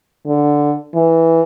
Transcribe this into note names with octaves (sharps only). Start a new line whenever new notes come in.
D3
E3